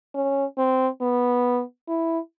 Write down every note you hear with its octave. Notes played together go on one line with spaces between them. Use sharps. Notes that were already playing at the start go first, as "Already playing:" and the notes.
C#4
C4
B3
E4